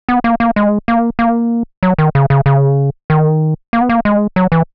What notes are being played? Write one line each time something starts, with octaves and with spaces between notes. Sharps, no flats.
B3
A#3
A#3
G#3
A#3
A#3
F#3
D#3
C#3
C#3
C#3
D#3
A#3
B3
A#3
G#3
F#3
E3